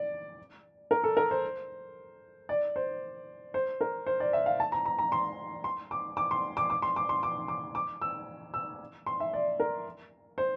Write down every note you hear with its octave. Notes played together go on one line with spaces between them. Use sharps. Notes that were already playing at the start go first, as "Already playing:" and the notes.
Already playing: D5
A#4
A4
A#4
C5
D5
C5
C5
A#4
C5
D5
E5
F5
A5
A#5
A#5
A#5
C6
C6
D6
D6
C6
D6
D6
C6
D6
C6
D6
D6
D6
E6
E6
C6
E5
D5
A#4
C5